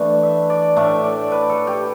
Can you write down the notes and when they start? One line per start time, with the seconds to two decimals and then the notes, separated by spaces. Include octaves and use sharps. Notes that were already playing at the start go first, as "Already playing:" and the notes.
Already playing: E3 A3 D4 B4
0.23 E5
0.50 D5
0.76 A2 A3 D4 E5
1.04 D5
1.32 B4
1.50 A4
1.67 G4